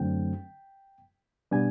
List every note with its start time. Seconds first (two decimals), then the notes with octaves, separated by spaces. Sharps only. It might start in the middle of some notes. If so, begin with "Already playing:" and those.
Already playing: F#2 D3 F#3 A3 C4 G5
1.51 B2 G3 B3 D4 G#5